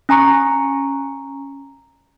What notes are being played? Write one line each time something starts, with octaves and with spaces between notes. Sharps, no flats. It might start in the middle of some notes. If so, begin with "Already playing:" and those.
C#4 G#5 A#5 C#6 C#7